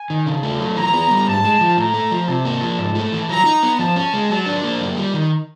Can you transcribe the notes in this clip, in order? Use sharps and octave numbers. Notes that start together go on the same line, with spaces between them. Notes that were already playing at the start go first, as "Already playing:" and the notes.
Already playing: G#5
D#3
C#3 A5
A3
F#3
E3 A#5
B3
G3
G#2 A5
G#3
F3
A2 A#5
A3
F3
C3 A5
A#3
F3
G#2
A3
E3
F#3 A#5
D#4
B3
F3 A5
C#4
G#3
F#3 A5
D4
A#3
F#2
G3
D#3